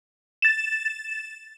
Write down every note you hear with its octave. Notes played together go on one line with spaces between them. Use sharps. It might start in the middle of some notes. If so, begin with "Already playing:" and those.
A6 E7